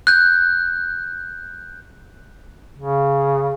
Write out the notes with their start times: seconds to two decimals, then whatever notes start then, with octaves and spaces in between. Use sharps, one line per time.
0.07 F#6 G6
2.78 C#3